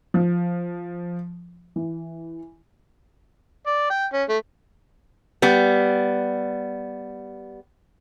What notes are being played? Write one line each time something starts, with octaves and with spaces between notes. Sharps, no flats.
F3
E3
D5
G5
C#4
A3
G3 B3